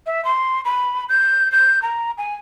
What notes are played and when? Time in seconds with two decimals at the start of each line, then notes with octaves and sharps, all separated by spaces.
0.06 E5
0.25 C6
0.65 B5
1.09 G6
1.52 G6
1.82 A#5
2.18 G#5